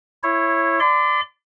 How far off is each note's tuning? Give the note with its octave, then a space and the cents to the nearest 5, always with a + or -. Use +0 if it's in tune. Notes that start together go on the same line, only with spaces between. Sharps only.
E4 +15 C#5 -15
D5 +5 C6 -40